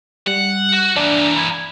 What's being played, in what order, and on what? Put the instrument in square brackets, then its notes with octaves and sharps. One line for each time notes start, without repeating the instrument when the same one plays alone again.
[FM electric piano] G3 [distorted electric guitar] F#5
[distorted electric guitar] F#4
[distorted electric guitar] E3 A#3 [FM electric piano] D4
[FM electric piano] B5 G#6